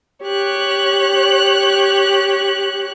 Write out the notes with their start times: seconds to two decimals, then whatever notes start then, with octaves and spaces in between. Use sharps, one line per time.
0.24 G4 C#5 F#6